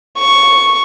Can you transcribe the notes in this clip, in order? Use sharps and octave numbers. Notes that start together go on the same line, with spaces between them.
C#6